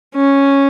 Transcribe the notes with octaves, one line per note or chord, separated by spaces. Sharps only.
C#4